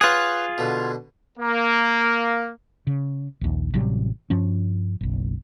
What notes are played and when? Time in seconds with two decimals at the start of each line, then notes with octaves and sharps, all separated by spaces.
0.01 F4 G#4 B4 C#5 F#5
0.58 B2 D3
1.38 A#3
2.87 C#3
3.41 A#1 D#2
3.74 A1 C3 F#3 G3
4.30 G2 F3 C#4
5.01 F#1 B1